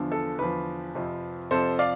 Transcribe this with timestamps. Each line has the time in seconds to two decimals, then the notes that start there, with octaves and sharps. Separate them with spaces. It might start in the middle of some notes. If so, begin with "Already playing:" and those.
Already playing: E2 D3 F3
0.12 A4
0.39 E2 D3 F3 B4
0.95 F2 C3 F3
1.51 F2 C3 F3 A4 C5
1.79 D5 F5